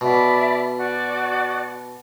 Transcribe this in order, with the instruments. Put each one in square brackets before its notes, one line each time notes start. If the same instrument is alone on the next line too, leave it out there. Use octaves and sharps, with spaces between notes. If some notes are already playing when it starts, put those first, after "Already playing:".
[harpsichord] B2 [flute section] D5 E5 B5
[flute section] F#4 D5